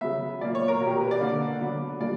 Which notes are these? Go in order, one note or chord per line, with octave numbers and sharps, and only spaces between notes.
C#3 F#3 B3 E5
A#2 A#3 D5
C#5
A#4
B2 A#3 G4 A#4
A#4
B4
D5
D3 A#3
D3 F#3 B3
A#2 G3 A#3 D5